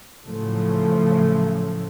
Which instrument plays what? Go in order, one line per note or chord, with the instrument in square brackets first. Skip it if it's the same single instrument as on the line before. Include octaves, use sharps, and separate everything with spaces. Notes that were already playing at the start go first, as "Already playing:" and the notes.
[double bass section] A2 C#3 F3 F#3 A3